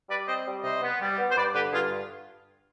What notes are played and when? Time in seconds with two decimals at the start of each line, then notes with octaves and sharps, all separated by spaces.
0.09 G3 B4 D5
0.27 C4 C5 D#5
0.46 G3
0.63 C3 C5 D#5
0.82 B3
1.00 G3
1.18 B3
1.31 C5
1.36 G2 B4 D5
1.54 D3 G4 B4
1.72 G2 F4 G#4